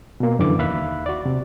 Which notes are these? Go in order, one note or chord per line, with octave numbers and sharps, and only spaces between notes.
B2 A#3
F#2 D3 E3 D6
D#2 E5 F5 B5 F#6
F#4 D5
C3